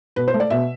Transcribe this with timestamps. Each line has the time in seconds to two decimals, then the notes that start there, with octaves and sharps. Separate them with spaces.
0.16 B2 B4
0.28 C5
0.34 A3
0.40 D5
0.50 B2 E5